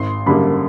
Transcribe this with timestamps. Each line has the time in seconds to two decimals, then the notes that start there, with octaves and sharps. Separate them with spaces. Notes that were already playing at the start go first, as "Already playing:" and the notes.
Already playing: G#1 C6
0.26 F#2 D3 G3 A#3 B5